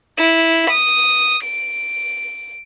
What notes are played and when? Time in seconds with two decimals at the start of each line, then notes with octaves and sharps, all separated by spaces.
0.18 E4
0.71 D#6
1.44 D7